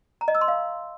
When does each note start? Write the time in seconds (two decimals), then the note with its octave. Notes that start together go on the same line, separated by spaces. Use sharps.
0.21 A#5
0.28 D#5
0.35 E6
0.41 C6
0.48 F5